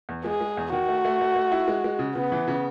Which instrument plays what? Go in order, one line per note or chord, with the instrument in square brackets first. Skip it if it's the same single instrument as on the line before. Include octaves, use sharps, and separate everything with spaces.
[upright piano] E2
[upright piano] G#3 [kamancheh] G#4
[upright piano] G#3
E2
[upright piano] D#3 [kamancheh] F#4
[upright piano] A3
A3
A3
A3
E4
G#3
G#3
C#3
[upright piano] C#3 [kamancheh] B3
[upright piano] E3
C#3